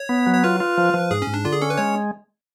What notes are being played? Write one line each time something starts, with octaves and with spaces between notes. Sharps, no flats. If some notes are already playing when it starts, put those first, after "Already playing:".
Already playing: C#5
B3
F#3
C#5
F4 B4
F4
F3
F3
G#2 G#4
C#4
G#2
D4
D3 F4
G#4
C#4 A4
B4
G#3 C#5